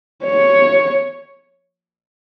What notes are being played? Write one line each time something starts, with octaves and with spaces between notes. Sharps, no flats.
C#5